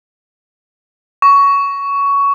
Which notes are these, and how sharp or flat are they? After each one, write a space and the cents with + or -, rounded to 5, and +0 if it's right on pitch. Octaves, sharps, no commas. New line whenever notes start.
C#6 +15